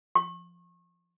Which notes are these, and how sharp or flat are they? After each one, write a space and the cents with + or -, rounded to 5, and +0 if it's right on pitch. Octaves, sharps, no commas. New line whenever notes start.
C#6 -35